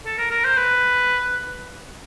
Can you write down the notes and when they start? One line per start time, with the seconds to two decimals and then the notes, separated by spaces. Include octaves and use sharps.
0.06 A4
0.18 A#4
0.31 A#4
0.45 C5
0.57 B4